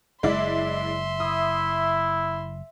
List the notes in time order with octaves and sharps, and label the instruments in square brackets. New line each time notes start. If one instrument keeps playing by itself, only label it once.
[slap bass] F#1 [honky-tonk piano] G#3 E4 D5 [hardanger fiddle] E5 C6
[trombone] E4 [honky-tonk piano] D#6